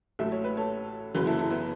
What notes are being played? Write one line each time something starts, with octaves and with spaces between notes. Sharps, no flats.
A1 A2 F#3 A3 E5
C#5
B4
A4 C#5
F#1 F#2 C#3 E3 F#4 B4
E4 A4
E4 A4
B3 E4